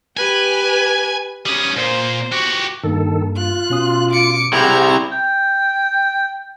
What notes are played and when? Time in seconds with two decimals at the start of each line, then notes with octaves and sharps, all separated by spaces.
0.17 G4 B4 G#5
1.46 G3 C#4 D#6
1.77 A#2 C5
2.32 F#4 G4 C#6
2.83 G2 D#3 A#3 A4
3.37 F4 F#6
3.70 B2 C#4 D#6
4.11 D6 C#7
4.53 C3 C4 E4 G4 G#4 F#5 A#5 F6
5.12 G5